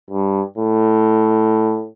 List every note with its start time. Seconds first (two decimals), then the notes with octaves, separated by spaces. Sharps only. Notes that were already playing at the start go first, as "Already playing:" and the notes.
0.11 G2
0.58 A2